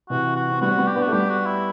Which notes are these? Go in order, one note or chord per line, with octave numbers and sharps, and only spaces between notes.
C3 E3 F#4
F#4
C4
G3 B3 F#4
C4
G3 B3
G4
B3 D4
F#4
A3
G3 B3 G4
F#4
E4